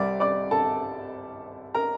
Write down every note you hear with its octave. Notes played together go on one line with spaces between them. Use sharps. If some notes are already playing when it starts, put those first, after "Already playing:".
Already playing: C2 C3 G3 D5 D6
D5 D6
A4 A5
A#4 A#5